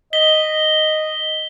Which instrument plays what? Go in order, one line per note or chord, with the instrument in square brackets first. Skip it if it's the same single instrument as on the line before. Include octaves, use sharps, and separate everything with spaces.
[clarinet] D#5 [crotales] B6 G7